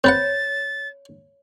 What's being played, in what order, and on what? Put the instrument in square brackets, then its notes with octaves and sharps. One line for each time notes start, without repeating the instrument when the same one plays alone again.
[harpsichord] C4 B4 F#5 [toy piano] C#5 [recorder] A6